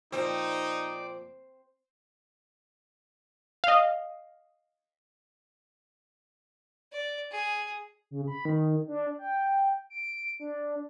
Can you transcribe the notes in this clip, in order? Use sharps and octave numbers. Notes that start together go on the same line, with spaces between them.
A#2 F3 C4 D#4 D5
D#5 F5
D5
G#4
C#3
B5
D#3
D4
G5
D7
D4